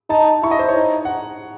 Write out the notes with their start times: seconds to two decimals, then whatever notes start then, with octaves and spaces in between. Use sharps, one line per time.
0.10 D#4 A5
0.43 E4 C#6
0.51 D#5
0.59 C5
0.69 C#5
0.76 D#4
1.05 F#5